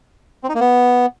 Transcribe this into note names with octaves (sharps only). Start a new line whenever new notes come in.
C4
D#4
A#3
B3